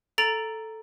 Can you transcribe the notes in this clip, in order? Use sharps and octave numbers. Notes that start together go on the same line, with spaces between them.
A4 A#5 A6 D7 F7